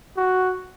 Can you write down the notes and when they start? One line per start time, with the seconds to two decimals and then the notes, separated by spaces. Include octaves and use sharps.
0.17 F#4